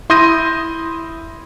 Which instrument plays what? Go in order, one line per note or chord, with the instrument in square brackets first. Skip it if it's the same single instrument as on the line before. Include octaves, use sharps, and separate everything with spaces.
[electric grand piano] E4 C6 D#6 G6 A#6 D#7